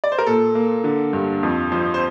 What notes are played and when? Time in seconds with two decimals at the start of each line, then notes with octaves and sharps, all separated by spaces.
0.04 D5
0.12 C5
0.18 A#4
0.27 A#2 A4
0.55 A#3
0.84 D3
1.13 G2
1.43 F2
1.72 F3 C5
1.94 C5